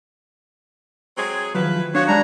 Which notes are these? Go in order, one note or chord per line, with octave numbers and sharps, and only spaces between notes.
F#3 C4 G#4
D#3 F3 F#3 E4 B4
F3 D4 F#4 C#5 F5
G3 G#3 D4 A#5